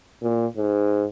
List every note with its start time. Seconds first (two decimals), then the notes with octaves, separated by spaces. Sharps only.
0.22 A#2
0.57 G#2